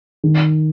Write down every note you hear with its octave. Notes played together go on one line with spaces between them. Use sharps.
D#3